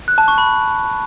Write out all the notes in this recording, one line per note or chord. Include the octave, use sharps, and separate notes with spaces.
F#6
A5
C#6
B5